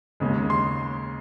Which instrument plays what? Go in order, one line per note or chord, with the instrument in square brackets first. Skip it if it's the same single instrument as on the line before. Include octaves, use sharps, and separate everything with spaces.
[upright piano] D#2 C#3 G#3
[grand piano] C6